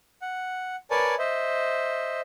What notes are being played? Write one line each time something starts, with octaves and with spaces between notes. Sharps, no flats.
F#5
A#4 B4 C#5 D5 G#5 A5
C5 D#5 E5